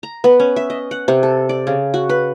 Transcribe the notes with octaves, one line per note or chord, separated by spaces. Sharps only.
A#5
B3
C#4
E5
D#5
F#5
C3
A4
D5
C#3
F#4
B4